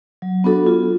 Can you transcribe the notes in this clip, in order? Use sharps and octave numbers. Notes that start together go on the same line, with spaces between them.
F#3
B3 D4 F#4 A4
F4